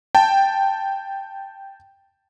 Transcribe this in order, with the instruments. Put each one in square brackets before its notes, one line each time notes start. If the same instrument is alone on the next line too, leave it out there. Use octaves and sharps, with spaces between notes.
[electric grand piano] G5 A5